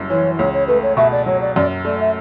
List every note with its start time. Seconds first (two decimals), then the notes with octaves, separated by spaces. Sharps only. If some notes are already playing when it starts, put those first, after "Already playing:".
Already playing: F#1 F#2 G3
0.10 E3 C#5
0.39 C#2 C#5
0.54 C#5
0.67 A3 B4
0.83 C#5
0.97 B2 E5
1.12 D5
1.26 F#3 C#5
1.41 D5
1.56 F#2 D5
1.85 A3 D5
2.00 E5